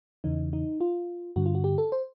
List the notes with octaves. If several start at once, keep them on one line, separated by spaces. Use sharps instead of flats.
E2 C#3 E3 D#4
D#4
F4
G2 D3 F#4
F4
F#4
G4
A4
C5